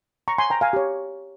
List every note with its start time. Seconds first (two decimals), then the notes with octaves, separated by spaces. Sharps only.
0.28 A#5 C#6
0.38 G#5 C6
0.50 G5 A#5
0.61 F5 G#5
0.73 G4 C#5